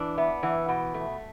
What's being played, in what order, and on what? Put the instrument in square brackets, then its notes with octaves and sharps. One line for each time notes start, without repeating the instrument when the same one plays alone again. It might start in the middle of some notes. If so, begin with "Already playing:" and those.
Already playing: [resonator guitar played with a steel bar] E3 D4
[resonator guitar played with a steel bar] B3 [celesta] E5
[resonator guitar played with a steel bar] E3 [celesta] F#5
[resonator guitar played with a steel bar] B2 [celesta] F#5
[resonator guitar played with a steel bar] A3